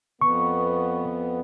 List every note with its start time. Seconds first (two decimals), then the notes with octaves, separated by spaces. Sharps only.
0.21 F2 B3 C#6